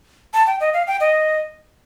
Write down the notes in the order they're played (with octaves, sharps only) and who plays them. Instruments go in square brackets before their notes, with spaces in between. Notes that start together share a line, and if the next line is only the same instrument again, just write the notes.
[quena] A5
G5
D#5
F5
G5
D#5